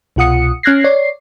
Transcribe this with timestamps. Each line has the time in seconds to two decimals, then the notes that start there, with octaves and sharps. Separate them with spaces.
0.16 C2 B2 F4 F#5 D#6 C#7
0.63 C#4 F6 F#6 G#6 A#6 C7
0.84 C#5 D5 C7